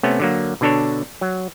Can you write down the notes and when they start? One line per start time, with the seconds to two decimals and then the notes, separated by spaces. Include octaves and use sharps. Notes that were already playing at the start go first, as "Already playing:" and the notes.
0.03 C3 A3 B3 C#4
0.20 D3 F#3 A#3
0.61 B2 D3 D4 A4 C#5
1.21 F#3